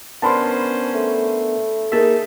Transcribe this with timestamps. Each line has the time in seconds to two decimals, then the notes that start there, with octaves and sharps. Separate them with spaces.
0.22 B3 C#4 D4 A#4 C5 A5 B5 C6
0.94 A3
1.92 A#3 D#4 G#4 A#4 E5 A5